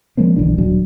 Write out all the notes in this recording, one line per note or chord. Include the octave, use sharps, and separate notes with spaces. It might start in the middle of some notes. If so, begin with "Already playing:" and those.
F3 G#3 A#3 C4
B1 D3 E3 D4
D#1 F#3 D4